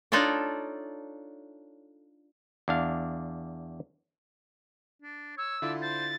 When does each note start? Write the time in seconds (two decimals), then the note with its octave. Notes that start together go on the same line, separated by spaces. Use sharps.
0.12 D4 D#4 F4 A4 C#5 D5
2.68 E2 D4 F5
5.02 D4
5.37 C#5 E6
5.62 D3 E4 F4 D5
5.81 C5 A6